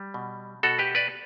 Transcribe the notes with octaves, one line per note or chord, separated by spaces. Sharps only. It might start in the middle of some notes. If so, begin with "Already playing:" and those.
Already playing: G3
B2
B2 F#4 A4
G4 B4
B4 D5